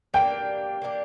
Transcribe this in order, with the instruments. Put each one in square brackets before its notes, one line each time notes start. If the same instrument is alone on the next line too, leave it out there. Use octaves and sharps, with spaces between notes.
[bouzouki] A#3 D4 G4 [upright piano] G5
[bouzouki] A#3 D4 G4